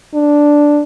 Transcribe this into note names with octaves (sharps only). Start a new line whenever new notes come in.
D4